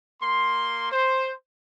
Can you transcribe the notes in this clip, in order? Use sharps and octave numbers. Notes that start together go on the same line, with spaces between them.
A#3 C6
C5